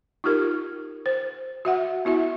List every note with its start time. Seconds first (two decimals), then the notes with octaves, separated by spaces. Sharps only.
0.24 D#4 F4 G4 A#4
1.06 C5
1.65 F#4 E5 F#5
2.05 B3 E4 F#4 E5